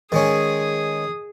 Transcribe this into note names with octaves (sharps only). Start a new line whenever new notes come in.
D#3 G#3 C#4 G#4 D#6